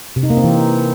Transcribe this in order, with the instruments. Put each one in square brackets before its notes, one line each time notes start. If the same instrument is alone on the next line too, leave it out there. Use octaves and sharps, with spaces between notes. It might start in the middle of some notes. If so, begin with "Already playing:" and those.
[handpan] C3
D#4
A#3
C4
E3